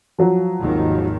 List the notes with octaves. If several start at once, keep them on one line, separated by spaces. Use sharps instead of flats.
F3 F#3
G#1 D#2 D#3